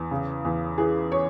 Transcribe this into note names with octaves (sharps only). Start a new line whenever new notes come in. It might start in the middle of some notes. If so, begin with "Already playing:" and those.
Already playing: E2
C#3
E2
E3 G#4
C#5